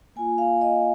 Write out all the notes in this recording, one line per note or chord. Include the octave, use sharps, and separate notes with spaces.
A#3 F4 G#5
F5
D#5